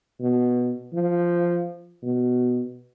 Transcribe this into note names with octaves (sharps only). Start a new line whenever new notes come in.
B2
F3
B2